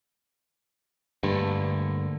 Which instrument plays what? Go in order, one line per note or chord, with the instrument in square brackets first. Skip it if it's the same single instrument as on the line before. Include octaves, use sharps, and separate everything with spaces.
[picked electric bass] G2 [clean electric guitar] D3 A3 A#3